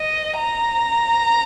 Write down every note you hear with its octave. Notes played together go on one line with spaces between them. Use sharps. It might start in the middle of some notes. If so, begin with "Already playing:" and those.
Already playing: D#5
A#5